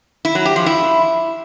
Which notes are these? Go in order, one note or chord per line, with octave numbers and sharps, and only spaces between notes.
E4
F#3
G4
F3
E4